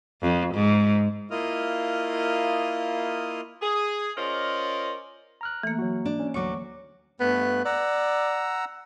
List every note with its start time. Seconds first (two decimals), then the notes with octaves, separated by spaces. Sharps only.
0.22 F2
0.54 G#2
1.31 A#3 E4 F4 D#5 D#6 F6
3.62 G#4
4.17 C#4 F4 A#4 C5 D5 D#5
5.41 A#5 F6 F#6
5.63 E3 A3 A#3
5.79 F#3 F#4
6.05 D4
6.20 C#4
6.34 D2 F#3 C#5 F#5 C#6 D6
7.20 G2 A3 B3 F#6
7.65 D5 F#5 A#5 E6